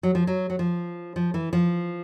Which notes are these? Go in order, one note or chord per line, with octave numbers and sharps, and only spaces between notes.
F#3
F3
F#3
F#3
F3
F3
E3
F3